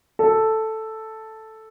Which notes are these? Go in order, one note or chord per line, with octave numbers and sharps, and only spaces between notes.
A4